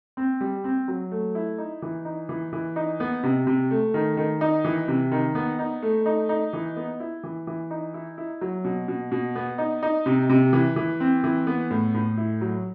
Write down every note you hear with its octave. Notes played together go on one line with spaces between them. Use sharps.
C4
G3
C4
F#3
A3
E4
D#4
E3
D#4
E3
E3
D#4
B3
C3
C3
A3
D#3
D#3
D#4
E3
C3
D#3
B3
D#4
A3
D#4
D#4
E3
B3
E4
E3
E3
D#4
E4
E4
F#3
B2
B2
B2
B3
D#4
D#4
C3
C3
E3
E3
C4
E3
B3
A2
A2
E4
F#3